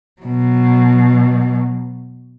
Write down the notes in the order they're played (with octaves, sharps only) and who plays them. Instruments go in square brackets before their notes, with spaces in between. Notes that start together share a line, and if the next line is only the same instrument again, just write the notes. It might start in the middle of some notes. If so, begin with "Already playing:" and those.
[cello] B2 F#3